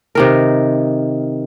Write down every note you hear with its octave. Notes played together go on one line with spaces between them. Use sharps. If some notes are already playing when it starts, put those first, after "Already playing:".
C3 D#3 A#4